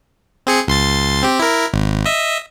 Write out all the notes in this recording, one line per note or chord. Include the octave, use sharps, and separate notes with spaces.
C4 G#4 C#7
C#2 C6 A6
C4 G4
E4 A#4
G#1
D#5 E5